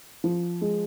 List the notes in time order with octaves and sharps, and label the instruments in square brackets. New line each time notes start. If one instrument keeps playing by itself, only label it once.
[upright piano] F3
G#3